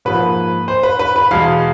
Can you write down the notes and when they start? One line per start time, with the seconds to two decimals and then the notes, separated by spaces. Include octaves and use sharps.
0.05 G#2 F3 A#3 B4
0.68 C5
0.83 B4
0.99 B4
1.16 B4
1.31 E2 B2 G#3 F5